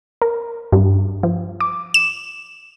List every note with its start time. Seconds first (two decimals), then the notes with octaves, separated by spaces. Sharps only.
0.22 A#4
0.72 G2
1.23 F3
1.60 D6
1.94 E7